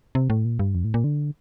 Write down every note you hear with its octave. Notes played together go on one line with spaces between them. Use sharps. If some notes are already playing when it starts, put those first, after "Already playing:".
C3
A2
A#2
G2
F2
A2
A#2
D3